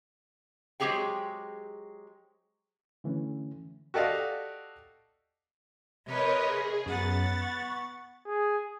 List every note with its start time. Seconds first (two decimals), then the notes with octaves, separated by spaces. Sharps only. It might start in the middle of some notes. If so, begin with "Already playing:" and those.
0.80 F#3 G#3 C4 G4 G#4 G5
3.04 D3 E3 A3 C#4
3.94 F#4 G4 A4 D5 D#5 F5
6.06 C3 A#4 B4 C#5 D#5
6.45 G#4
6.86 F#2 B3 F#5 A6
7.42 C#6
8.27 G#4